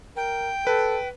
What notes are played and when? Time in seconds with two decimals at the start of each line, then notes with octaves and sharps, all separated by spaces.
0.16 A#4 G5
0.67 A4 B4